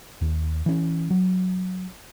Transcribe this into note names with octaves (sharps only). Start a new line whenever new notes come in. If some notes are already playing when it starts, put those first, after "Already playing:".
D#2
E3 C#4
F#3